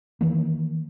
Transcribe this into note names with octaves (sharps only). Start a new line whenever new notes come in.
D#3 E3 A#3